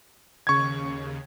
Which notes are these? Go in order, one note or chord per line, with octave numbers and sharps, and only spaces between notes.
D#2 C#3 C#6 G#6